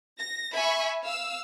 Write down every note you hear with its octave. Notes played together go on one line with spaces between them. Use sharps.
A#6
E5 G#5 B5 C#6
F5 E6